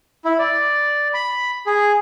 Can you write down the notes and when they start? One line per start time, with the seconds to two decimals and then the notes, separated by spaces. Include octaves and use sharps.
0.25 E4
0.39 D5
1.14 B5
1.66 G#4